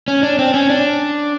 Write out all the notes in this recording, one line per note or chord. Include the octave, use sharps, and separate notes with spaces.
C#4
D4
C4
C#4
D4